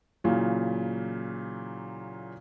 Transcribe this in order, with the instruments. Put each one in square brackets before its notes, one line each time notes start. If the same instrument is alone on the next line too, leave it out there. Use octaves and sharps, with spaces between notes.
[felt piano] A#2 C#3 E3 F#3